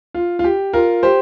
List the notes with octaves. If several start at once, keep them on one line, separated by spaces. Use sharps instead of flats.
F4
F4
G4
F4 A#4
G4 C5